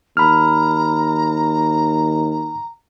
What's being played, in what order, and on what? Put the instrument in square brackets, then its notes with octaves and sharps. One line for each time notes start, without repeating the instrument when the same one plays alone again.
[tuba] D#2 [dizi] A#5 [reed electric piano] B5 F6